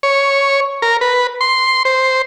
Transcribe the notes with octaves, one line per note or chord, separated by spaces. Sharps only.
C#5
A#4
B4
C6
C5